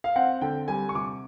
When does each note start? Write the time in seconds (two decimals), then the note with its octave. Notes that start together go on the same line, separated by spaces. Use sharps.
0.04 F5
0.16 C4 F#5
0.41 D3 G5
0.68 G3 G#5
0.89 C#6
0.95 C3 D6